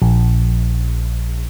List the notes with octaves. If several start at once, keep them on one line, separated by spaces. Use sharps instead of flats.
A#1